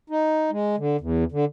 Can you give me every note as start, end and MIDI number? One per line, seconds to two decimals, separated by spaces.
0.10 0.51 63
0.51 0.76 56
0.78 0.97 50
1.01 1.24 40
1.32 1.45 50